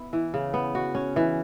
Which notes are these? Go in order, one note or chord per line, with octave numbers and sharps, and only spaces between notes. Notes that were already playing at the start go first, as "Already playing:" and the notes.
Already playing: B3 E4
E3
C#3
B3
F#4
C#4
E3